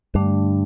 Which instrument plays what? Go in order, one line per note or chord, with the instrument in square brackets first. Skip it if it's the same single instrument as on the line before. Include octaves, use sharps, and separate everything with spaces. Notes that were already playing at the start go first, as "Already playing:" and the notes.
[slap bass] G2 [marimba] D3 A3 D4